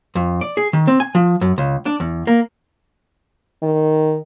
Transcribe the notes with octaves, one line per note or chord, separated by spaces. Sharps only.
F2
D5
G#4
D#3
C4
G#5
F3
F#2
C#2
D4
E2
A#3
D#3